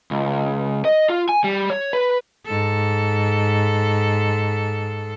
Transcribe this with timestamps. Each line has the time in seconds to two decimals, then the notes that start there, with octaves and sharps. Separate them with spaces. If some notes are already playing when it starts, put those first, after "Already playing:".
0.11 C#2
0.85 D#5
1.10 F4
1.29 G#5
1.44 G3
1.70 C#5
1.93 B4
2.46 G#2 A4